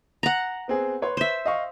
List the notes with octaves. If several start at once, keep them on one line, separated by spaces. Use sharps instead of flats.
F#5 A#5
B3 C4 G#4
B4 C#5 C6
C5 E5
D#5 F5 C#6